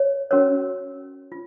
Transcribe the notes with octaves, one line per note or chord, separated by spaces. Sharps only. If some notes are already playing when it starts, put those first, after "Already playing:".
Already playing: C#5
C#4 F#4 A#4 C#5
F4